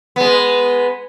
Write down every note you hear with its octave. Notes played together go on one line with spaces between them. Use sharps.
G#3 B3